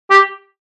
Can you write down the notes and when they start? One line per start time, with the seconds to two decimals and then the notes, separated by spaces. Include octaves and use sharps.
0.10 G4